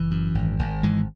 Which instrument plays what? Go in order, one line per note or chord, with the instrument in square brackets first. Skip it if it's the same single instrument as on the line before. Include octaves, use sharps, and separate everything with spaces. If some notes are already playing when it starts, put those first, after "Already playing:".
Already playing: [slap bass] F#1 E3
F#2
G#1
G#1
G#2 E3 G#3